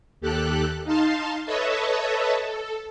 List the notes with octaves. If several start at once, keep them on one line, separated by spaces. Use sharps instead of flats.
D#2 G4 A4 F#6
D#4 F5 A5 C6
A4 B4 C#5 D#5 E5 A5
A4